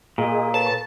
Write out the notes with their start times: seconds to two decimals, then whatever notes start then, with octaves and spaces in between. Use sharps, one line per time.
0.18 A#2 G#4 D#5
0.54 A4 B4 C#5 A5